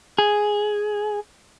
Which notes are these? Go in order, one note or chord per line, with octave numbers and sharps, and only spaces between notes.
G#4